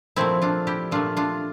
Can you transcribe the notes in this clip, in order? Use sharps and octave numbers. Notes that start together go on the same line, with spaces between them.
A#2 F3 A3 C4 E4
D4 F4
E4 G4
A#2 A3 D4 F4
D4 F4